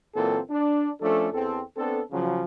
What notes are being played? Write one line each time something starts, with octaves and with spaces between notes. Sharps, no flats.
A#2 E3 F#3 A#3 C4 A4
D4
F3 A3 C#4 D4 A4
E2 C4 A4
B3 C4 D4 A4
C#3 F3 F#3